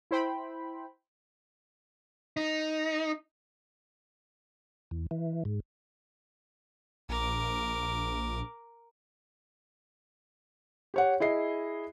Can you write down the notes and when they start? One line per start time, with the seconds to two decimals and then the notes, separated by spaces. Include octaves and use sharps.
0.11 E4 C5 G5 B5
2.37 D#4
4.91 E2
5.11 E3
5.45 G#2
7.09 A#1 A#4 D6
10.94 G4 C#5 F#5
11.20 E4 G#4 D#5 C7